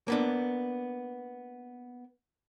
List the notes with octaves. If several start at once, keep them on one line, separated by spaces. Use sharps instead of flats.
A#3 B3 D4